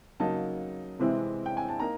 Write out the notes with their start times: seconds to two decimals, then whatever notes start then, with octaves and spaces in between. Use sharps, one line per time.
0.20 C#3 F#3 A#3 D#4 A5
0.99 C3 E3 G#3 C4 E4
1.46 G5
1.57 G#5
1.68 A5
1.80 A#3 D#4 A#5